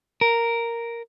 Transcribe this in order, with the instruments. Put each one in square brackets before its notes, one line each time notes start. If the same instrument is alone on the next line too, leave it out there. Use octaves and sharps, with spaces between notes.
[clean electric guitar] A#4